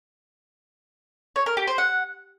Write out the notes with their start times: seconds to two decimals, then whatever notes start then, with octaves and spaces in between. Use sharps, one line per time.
1.36 C#5
1.46 A#4
1.57 G4
1.67 C5
1.78 F#5